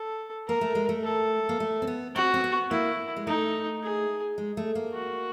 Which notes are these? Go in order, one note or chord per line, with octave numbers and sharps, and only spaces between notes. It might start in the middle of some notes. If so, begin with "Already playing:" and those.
Already playing: A4
A#3 A#4
A3
G#3
A3
A4
A#3
A3
C4
B3
C4 F#4
C4
B3
A#3 E4
G#3
A3 D#4
G#4
G#3
A3
A#3
F#4